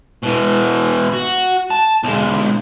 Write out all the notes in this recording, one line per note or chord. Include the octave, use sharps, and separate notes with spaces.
B2 E3
F#4
A5
B1 G#3